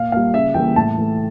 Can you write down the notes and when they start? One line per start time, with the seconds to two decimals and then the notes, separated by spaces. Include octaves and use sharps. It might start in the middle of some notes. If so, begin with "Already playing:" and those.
Already playing: A#2 F5
0.12 G3 A#3 F5
0.34 C#3 E5
0.54 E3 G3 A#3 G5
0.76 A2 A5
0.97 E3 A3